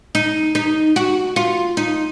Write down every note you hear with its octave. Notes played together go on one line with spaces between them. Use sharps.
D#4
D#4
F#4
F4
D#4